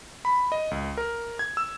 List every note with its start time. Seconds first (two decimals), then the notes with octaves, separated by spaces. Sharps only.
0.25 B5
0.52 D#5
0.71 C#2
0.97 A#4
1.39 G#6
1.57 E6